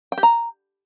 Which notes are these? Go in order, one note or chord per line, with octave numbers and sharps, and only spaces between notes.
G5
G4
A#5